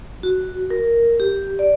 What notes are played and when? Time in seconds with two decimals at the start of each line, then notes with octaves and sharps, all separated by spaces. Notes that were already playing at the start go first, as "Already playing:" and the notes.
0.23 F#4
0.70 A#4
1.20 G4
1.59 D5